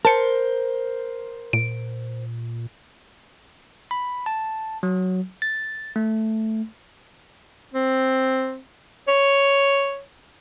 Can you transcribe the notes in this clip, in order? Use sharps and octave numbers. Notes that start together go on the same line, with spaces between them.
A#4 C5 A5 C#7
A#2 D7
B5
A5
F#3
A6
A3
C4
C#5